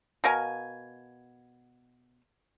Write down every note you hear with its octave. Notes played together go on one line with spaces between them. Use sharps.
B2 A#4 F5 G#5